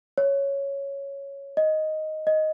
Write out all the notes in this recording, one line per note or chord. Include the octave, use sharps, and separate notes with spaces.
C#5
D#5
D#5